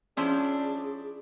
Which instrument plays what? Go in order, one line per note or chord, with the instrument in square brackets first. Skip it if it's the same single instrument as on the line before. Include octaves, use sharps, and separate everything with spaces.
[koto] F3 E4 C5 [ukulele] C#4 [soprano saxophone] D4 [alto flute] G#4